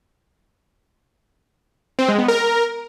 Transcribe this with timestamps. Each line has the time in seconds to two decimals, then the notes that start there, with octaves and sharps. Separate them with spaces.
1.99 C4
2.09 G#3
2.18 B3
2.28 A#4